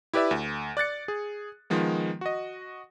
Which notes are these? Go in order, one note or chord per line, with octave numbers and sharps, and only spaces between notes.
E4 G4 B4 D5 E5
D2
D5 F#6 A6 C#7
G#4
D#3 F3 G#3 B3
F#4 D#5